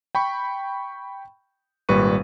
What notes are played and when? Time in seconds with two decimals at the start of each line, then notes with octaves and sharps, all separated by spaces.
0.15 G5 B5 C#6
1.89 G#1 A#2 G3 B4 C#6 D#7